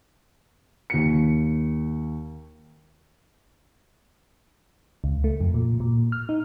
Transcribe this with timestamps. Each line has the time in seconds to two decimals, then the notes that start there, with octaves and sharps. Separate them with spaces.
0.90 D#2 C#7
5.04 C#2
5.24 A3
5.41 F2
5.54 A#2
5.80 A#2
6.12 F6
6.29 D#4